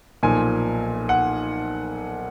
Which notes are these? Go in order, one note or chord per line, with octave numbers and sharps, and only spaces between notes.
B1 A#2 F3 G#5
F#5